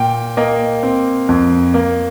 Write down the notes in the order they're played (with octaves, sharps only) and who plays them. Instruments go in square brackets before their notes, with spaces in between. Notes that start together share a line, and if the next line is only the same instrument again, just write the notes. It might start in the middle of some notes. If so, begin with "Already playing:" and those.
Already playing: [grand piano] A#2 G5
A#3 D#5
C4
F2
A#3